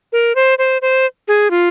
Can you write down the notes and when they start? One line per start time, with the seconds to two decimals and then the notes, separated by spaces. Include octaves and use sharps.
0.13 A#4
0.35 C5
0.58 C5
0.82 C5
1.28 G#4
1.51 F4